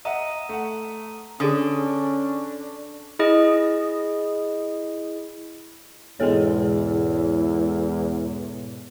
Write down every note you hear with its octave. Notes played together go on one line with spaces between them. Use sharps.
D#5 E5 F#5 A#5 D#6 D#7
A3 F#5
D3 C#4 D4 G#4 D#6
E4 G#4 D#5
E2 G#2 B2 G#3 B3 E4 A4 C#5